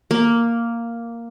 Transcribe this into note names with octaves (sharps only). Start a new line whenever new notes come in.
A#3